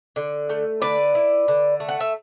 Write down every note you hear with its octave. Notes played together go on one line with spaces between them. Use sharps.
D3
A3
D3 B4 D5
E4
D3
A3
F#5
E5